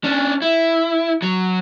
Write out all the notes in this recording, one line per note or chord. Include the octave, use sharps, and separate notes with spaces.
C#4 D4
E4
F#3